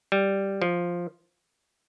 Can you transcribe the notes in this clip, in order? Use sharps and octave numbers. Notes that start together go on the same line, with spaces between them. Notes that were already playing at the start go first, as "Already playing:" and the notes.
G3
F3